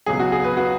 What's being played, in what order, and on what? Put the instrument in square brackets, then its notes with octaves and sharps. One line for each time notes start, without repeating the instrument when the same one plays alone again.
[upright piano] C#2 B2 F#3 G#4
F#4
G#4
B4
F#4